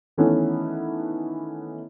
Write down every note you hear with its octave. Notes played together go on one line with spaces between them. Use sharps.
D#3 E3 A3 B3 C#4 E4